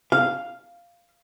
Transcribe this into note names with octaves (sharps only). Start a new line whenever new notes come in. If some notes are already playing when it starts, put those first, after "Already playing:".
F5